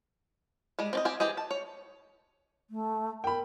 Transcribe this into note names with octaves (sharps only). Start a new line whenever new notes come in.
G3 G#3
C4 D5 D#5
C4 G4 G#5
E3 G4 G#4 D#5
A5
C#5
A3
A#4 G5 B5